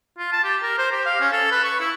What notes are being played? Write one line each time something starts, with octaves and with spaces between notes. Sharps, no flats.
F4
A5
G4
A#4
C5
G4
F5
C#4
A4
B4
C#6
E4